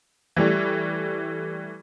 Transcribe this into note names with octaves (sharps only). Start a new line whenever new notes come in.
E3 G3 A3